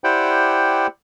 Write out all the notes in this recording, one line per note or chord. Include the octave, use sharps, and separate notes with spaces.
E4 G4 C5 D5 F#5 G5